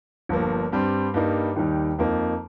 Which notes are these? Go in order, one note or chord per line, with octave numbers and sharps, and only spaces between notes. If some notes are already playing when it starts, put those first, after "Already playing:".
G1 G2 F3 A#3
G2 G3 C4
G2 G3 A#3 D#4
D#2 D#3 G3 D#4
F2 F3 A#3 D#4